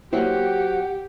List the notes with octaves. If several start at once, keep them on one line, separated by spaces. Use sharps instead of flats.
F#3 A#3 C4 E4 G4 F#5